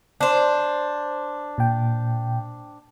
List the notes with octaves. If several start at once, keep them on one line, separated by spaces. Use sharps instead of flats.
D4 C5
A#2 G5